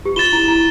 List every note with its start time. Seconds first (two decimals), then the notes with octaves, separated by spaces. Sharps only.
0.05 G4
0.16 F4 A6 E7 G7
0.32 E4
0.48 E4